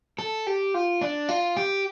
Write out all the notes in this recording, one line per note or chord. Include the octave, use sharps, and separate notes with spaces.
A4
G4
F4
D4
F4
G4